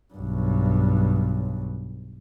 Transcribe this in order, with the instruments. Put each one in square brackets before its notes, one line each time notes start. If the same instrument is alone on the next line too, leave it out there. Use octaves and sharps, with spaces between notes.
[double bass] B1 G2